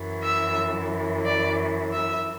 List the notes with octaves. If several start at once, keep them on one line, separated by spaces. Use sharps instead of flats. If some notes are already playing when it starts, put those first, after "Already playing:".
Already playing: F#2 E3
E5
D5
E5